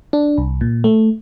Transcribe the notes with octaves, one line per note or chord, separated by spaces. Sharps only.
D4
C2
A#2
A3